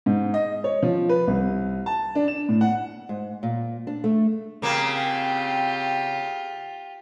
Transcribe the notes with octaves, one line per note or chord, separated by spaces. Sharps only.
G#2
D#5
C#5
F3
B4
C2
A5
D4
E7
A2
F#5
G#2
A#2
D4
A3
C#3 A#3 C4 F4 G4